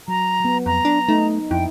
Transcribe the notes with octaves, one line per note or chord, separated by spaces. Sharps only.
F#3 A#5
F#3 B3
F2 A#5
D4
A3 D#4
F2 E4 G5